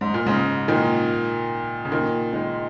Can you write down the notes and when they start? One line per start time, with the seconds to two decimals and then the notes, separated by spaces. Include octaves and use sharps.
0.01 G#2
0.14 A#2
0.26 G#2 C#3
0.68 A#2 D#3
1.85 C#3
1.92 A#2 D#3
2.33 D#3 G#3